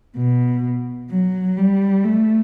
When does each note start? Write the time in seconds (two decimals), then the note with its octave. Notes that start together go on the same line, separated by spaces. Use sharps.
0.17 B2
1.11 F#3
1.57 G3
2.04 A3